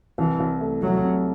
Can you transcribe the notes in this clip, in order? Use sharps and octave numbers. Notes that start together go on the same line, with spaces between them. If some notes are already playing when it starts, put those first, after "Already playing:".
C2 E3
C2
A3
C3 F#3
C3